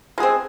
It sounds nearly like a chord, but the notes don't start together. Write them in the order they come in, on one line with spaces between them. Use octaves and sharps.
G#3 G#4 C4